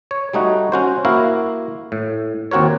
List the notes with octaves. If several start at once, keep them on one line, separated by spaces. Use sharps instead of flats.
C#5
G3 A3 D#4 F#4
C#4 F#4 C5
A#3 E4 F#4 A#4 F5
A2
D#2 C4 F#4 A#4 C#5